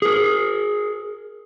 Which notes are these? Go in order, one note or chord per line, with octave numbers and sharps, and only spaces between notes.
G#4 A#4